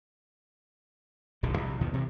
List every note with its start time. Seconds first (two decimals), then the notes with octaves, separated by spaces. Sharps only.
1.43 D1 B1 D3 D#3
1.57 A#1 C3
1.81 D#2 B2 D#3 F3
1.93 G2 C3 E3